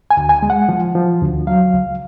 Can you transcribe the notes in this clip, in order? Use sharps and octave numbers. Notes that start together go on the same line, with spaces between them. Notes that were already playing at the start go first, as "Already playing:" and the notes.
G#5
D2
G#5
G#3
F#5
F3
F3
D2
F#3 F5
C#2